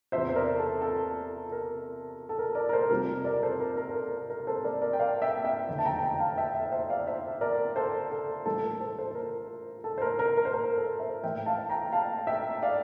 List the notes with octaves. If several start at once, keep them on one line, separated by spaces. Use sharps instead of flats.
E2 C3 F3 C5 E5
C5
A#4 D5
A4
A4
A#4
A4
A#4
A#4 D5
A#4
A4 C5
F2 C3 G3 A#4
A#4 D5
A4 C5
A#4
A#4
A4
A#4
A#4
A#4
A4 C5
A#4 D5
A#4 D5
G5
D5 F5
E5 G5
E5 G5
F1 E2 D3
A5
G5 A#5
G5 A#5
F5 A5
E5 G5
E5 G5
C5 E5
D5 F5
C5 E5
A#4 D5
A4 C5
A4
A#1 A2 E3 G3 A4
A#4
A4 C5
A4 C5
A4
A#4
A4
C5
A#4
A#4
A#4
C5
A#4
A4 C5
C5 E5
A1 A2 E3 E5 G5
F5 A5
G5 A#5
F5 A5
E5 G5
D5 F5